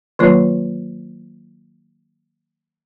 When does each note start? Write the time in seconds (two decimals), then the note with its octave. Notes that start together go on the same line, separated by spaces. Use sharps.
0.19 D#3 F#3 A#3 F4